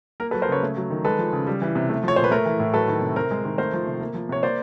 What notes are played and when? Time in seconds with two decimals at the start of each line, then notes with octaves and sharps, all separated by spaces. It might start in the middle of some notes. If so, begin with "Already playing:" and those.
0.20 A#3 A#4
0.31 A4 B4
0.34 F#3
0.42 A#4 C5
0.49 C#3 B4 C#5
0.63 A3
0.77 F#3
0.90 D#3
1.05 G#3 A4 B4
1.19 F3
1.33 C#3
1.47 G3
1.62 E3
1.75 C3
1.90 A3
2.03 F3 C#5
2.16 A#2 C5
2.24 B4
2.31 A3 A#4
2.46 E3
2.60 A2
2.73 F#3 A4 B4
2.88 D#3
3.02 C3
3.16 C4 A#4
3.31 G#3
3.44 D#3
3.58 A3 A#4 C5
3.73 F3
3.87 C3
4.00 A#3
4.14 F3
4.29 C3 C#5
4.43 A#3 C5 D5